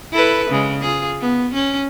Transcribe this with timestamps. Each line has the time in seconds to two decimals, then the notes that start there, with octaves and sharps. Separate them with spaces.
0.12 E4 A4 B4
0.50 C#3 G#3
0.81 F4 G#4
1.21 B3
1.54 C#4